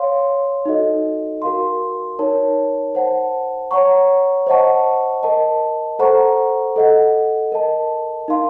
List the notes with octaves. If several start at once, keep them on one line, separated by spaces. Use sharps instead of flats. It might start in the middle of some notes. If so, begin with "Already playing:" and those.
Already playing: C#5 F5 C6
D#4 F#4 A4 D#5
F#4 A#4 F5 C6
D#4 A#4 C#5 A5
C5 F#5 A5
C#5 F#5 A#5 C#6
C5 D#5 F#5 A5 C#6
A#4 D#5 A5
A4 C5 F#5 A#5 C#6
A4 D#5 F#5
A#4 D#5 A5
D#4 A#4 F5 C6